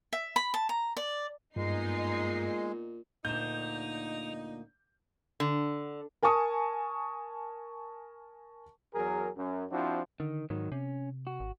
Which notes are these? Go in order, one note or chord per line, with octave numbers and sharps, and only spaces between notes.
E5
B5
A5
A#5
D5
G2 A#2 G#3 B3 D#4 C7
D2 A#2 A#3 D#4 G6 E7
D3
A#4 G#5 A5 C#6 D#6
E2 F#3 G#4 A#4
F#2
F3 C4 D4 E4 F#4
D3 D#3
G#2 D#3 F#3
C3 C#4
F#4
G#1